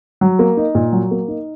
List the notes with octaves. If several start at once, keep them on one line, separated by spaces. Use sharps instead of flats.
F#3
A#3
D#4
A#2
F#3
A#3
D#4